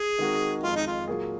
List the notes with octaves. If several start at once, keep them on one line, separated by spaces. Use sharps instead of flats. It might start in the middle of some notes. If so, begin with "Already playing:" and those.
Already playing: G#4
D#3 G#3 C4 F#4 A#4
F2 D#3 G#3 F4
D#4
F4
A#2 F#3 A#3 F4 G#4